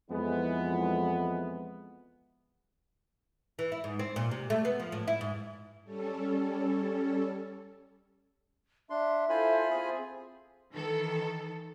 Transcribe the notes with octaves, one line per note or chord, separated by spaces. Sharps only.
F2 E3 G#3 B3
E3
E4
G#2
C4
A#2
C3
A3
B3
F3
A2
E4
G#2
G3 C#4 A4
D4 E5 C6
E4 F4 A4 C5 G#5 B5
C4 G#4
D#3 E3 A4